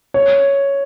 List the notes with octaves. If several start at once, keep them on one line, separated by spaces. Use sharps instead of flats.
C#5